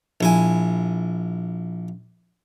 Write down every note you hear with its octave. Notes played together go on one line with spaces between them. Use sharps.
A#1 E4 G#5